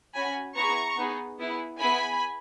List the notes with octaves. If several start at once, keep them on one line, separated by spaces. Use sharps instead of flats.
C#4 F#4 G#5 B5
B3 E4 G#4 A#5 C#6
B3 D#4 G#4
B3 E4 G#4
B3 E4 G#4 G#5 B5